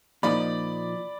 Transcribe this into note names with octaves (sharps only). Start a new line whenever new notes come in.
A#2 F3 D#4 D5 B5